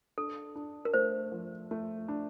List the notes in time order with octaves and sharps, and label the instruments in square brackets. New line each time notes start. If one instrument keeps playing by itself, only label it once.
[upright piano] D4 [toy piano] A4
[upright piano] D4
[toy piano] A#4
[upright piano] A3 [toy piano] C5
[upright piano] F3
A3
D4